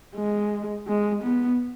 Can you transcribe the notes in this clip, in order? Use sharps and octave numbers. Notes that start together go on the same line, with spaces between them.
G#3
G#3
B3